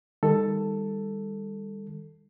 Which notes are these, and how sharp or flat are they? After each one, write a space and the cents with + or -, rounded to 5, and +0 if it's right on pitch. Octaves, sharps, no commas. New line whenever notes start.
D#3 +0 G3 +40 A4 +10